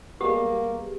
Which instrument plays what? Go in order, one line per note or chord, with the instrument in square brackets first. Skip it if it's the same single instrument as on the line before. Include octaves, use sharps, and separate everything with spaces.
[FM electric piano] G3 G#3 B3 [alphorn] A#3 [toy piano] G4